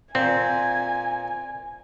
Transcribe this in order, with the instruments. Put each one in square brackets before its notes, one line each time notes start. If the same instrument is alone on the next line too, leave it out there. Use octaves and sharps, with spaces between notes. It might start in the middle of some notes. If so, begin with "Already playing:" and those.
[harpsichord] A#2 [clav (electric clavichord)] C4 [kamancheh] G#5